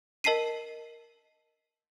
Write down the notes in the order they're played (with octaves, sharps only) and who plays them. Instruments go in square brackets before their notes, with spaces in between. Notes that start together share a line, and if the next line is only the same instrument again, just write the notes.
[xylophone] A#4 D#5 A5 B6 C7 D#7